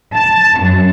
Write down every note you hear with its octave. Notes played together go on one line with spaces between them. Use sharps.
A5
F#2